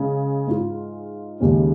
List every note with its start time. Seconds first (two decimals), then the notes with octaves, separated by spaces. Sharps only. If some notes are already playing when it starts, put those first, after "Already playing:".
Already playing: C#3 G#3
0.47 G#2 G#3 F4
1.40 D#2 C#3 G#3 C#4